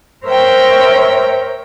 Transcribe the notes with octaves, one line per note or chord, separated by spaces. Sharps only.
A#4 C5 C#5 E5 G5 A#5